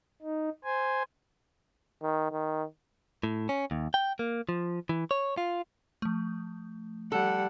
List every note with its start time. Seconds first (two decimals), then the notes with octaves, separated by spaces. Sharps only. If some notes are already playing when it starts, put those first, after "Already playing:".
0.22 D#4
0.64 C5 G#5
2.03 D#3
2.32 D#3
3.23 A2
3.49 C#4
3.71 D#2
3.94 G5
4.19 A#3
4.49 F3
4.89 E3
5.11 C#5
5.38 F4
6.02 F3 A3
7.12 G3 A4 F#5